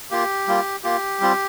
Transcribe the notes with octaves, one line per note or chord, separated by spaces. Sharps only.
A#3 F4 G4
G3 A#3 F4
A#3 F4 G4
G3 C4 F4